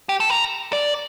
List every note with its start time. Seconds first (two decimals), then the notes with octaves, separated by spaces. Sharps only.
0.09 G4
0.20 A4
0.30 A#4
0.73 D5